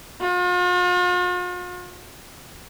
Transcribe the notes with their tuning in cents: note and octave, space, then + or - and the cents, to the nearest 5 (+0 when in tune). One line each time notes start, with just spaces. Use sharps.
F4 +45